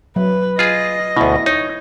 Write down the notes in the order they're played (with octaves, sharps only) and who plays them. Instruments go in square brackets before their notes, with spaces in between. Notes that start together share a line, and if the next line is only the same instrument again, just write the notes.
[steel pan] F#3 [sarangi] B4
[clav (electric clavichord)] F4 G#4 [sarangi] D#5
[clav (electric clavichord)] D2 B2 [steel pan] E4
[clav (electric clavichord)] D#4 [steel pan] C#5